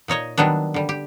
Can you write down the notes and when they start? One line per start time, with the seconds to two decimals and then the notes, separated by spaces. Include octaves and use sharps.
0.08 A#2 D#4 C#5 D#5
0.38 D#3 F#3 G3 B3 D4
0.74 D3 G3
0.89 G4